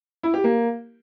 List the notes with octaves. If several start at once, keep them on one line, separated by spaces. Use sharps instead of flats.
E4
G4
A#3